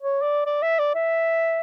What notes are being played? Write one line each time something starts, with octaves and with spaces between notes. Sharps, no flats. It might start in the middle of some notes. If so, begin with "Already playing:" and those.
C#5
D5
D5
E5
D5
E5